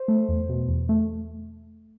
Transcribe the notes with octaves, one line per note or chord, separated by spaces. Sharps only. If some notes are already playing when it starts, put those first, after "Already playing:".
Already playing: C5
A3
E2
B2
E2
A3